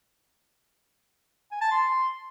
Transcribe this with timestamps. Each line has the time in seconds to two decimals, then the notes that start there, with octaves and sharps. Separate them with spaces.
1.51 G#5
1.61 A5
1.71 C6